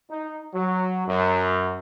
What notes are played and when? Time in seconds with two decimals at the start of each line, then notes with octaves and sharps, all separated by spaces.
0.10 D#4
0.55 F#3
1.08 F#2